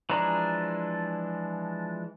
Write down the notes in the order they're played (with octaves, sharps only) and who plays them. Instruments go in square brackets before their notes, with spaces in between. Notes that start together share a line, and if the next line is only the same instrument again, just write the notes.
[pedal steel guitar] E3 F3 G#3 D4 A#5